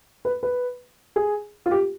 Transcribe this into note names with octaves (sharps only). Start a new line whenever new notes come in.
B4
B4
G#4
F4
G4